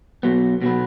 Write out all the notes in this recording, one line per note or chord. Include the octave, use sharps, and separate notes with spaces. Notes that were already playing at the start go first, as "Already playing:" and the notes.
B2 F#3 B3
B2 F#3 B3